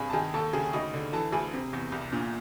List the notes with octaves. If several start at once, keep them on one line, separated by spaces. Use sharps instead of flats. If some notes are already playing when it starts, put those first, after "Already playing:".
Already playing: G2 C3 G#4 G#5
A5
D#3 G#4 G#5
D#2 A4 A5
C#3 G#4 G#5
D2 D#4 D#5
D3
E3 A4 A5
D2 G#4 G#5
C3
E2
C2
A#2